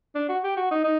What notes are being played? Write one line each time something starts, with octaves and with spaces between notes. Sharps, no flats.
D4
F#4
G4
F#4
D#4
D#4